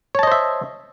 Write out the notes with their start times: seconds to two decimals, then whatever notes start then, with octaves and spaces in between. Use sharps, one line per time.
0.15 C#5
0.19 A5
0.23 D#5
0.27 C5
0.32 E5